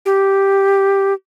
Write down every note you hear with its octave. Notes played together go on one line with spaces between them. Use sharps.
G4